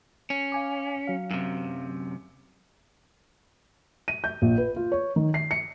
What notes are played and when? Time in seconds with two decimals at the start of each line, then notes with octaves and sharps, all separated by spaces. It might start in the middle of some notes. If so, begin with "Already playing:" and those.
0.30 C#4
0.52 F5 G#5 D6
1.07 F#3 F5
1.31 F#2 C3
4.08 D#7
4.24 G6
4.42 A#1
4.58 B4
4.76 F4
4.92 C#5
5.16 D#3
5.34 C7
5.51 C#7